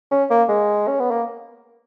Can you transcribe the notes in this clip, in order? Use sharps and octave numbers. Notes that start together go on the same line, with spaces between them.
C#4
A#3
G#3
C#4
B3
A#3